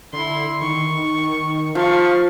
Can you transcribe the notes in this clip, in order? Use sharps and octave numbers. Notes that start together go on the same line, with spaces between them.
D3 E4 C6
D#3 C#6
F3 F5 C#6